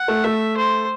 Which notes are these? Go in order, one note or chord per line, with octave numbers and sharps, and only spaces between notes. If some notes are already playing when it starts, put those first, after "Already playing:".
Already playing: F#5
A3
A3 E5
C5